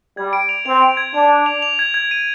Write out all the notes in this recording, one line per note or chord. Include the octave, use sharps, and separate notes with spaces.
G3 G#6
D7
F7
C4 F7
D7
G#6
D4 F7
G#6
F7
F7
G#6
G#6
D#7